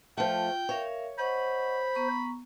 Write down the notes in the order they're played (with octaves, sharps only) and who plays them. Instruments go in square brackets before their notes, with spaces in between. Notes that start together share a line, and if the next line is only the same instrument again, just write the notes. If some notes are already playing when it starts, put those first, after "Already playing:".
[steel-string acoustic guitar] F3 A3 [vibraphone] F4 [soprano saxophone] G5
[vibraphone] A#4 E5 F5 [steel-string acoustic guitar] C#5
[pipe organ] C5 [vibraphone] D#5 F#5 C#6 [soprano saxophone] B5
[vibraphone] B3 A#5 C#6